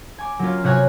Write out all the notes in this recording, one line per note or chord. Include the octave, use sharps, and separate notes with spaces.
G#5 D6
F#3 A#3 C#4 F4
C3 F#3 C#5 F#5 G#5